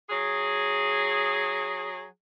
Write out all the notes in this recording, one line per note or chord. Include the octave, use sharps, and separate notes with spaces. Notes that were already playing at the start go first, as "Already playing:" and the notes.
F#3 G#4